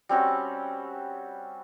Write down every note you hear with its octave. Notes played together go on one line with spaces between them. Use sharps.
G3 C4 C#4 F#4